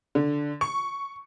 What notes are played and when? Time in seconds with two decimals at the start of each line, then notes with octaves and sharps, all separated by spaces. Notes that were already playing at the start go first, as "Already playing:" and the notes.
0.15 D3
0.61 C#6